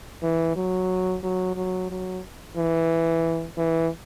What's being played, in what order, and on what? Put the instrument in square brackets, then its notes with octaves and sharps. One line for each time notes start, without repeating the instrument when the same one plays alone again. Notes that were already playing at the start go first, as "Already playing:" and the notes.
[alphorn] E3
F#3
F#3
F#3
F#3
E3
E3